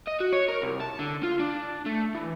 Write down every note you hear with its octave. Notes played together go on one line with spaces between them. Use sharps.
D#5
F#4
C#5
A#4
C2
A5
D3
F4
D4
A3
E3